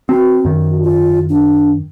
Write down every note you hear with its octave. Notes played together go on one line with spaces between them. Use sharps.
C4 F#4
F#2 D#3
F4
D4